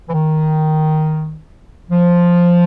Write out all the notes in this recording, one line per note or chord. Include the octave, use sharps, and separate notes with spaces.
E3
D#3
F3